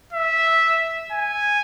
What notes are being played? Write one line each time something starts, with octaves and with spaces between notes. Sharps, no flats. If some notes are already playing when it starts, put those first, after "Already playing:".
E5
G#5